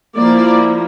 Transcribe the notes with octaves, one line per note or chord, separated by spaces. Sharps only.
F3 A#3 E4 D5